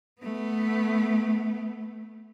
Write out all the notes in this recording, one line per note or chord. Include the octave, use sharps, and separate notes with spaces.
A3 B3